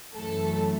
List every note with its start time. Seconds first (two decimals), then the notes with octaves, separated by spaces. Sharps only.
0.15 F#2 E3 A3 A4